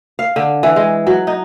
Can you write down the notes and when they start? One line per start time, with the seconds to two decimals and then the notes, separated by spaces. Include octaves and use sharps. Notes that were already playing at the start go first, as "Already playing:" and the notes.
0.19 F5
0.36 D3
0.63 E3
0.76 G#3
1.07 F#3
1.27 D#4